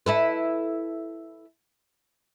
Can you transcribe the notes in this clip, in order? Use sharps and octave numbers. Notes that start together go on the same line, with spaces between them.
E4 A4 B4